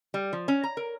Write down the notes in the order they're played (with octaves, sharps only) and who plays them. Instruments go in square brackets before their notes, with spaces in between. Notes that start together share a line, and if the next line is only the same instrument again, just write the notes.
[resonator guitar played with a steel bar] G3
F3
C#4
A#5
A#4